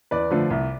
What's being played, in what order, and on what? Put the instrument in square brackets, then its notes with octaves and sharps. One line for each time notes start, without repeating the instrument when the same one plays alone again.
[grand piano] E2 B4 D5
D3 F3 A3
C2